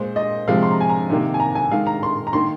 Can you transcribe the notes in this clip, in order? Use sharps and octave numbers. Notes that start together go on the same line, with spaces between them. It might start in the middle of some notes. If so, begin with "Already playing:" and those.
Already playing: A#2 G#3 C5
D#5
C3 F3 G#3 F5
C6
A#5
G#5
A#5
C3 D#3 A#3
G#5
A#5
G#5
D#3 G#3 F5
A#5
C6
A#5
D#3 A#3 C6